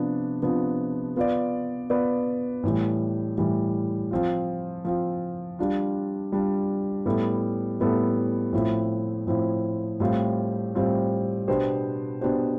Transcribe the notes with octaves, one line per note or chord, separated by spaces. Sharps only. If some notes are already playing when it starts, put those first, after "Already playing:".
Already playing: C3 F3 B3 D4
C3 F3 B3 D4
B3 F4 B4 D5
B3 F4 B4 D5
A2 E3 G3
A2 E3 G3
F3 C4 F4
F3 C4 F4
G3 D4 F4
G3 D4 F4
A2 G3 B3 E4 A4
A2 G3 B3 E4 A4
A2 F3 C4 E4
A2 F3 C4 E4
A2 G3 C4 F4
A2 G3 C4 F4
B2 B3 D4 G4 C5
B2 B3 D4 G4 C5